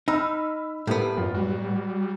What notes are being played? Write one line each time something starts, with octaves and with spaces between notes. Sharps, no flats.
D#4 B5 E6 F6
A2 G3 A#3 B3 A4
F#2 F4
F#3 G3 F#4